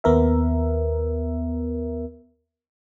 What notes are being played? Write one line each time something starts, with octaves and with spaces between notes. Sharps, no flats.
D#2 B3 A#4 E5